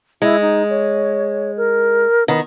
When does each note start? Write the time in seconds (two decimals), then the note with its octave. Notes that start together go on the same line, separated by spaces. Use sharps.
0.22 G#3 E4
0.42 D#4
0.70 C#5
1.57 A#4
2.28 D#3 B3